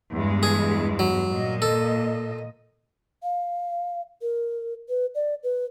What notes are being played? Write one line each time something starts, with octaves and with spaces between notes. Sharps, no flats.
E2 G2 G#3
G#4
F#3
A#2 D#5
A4
F5
A#4
B4
D5
B4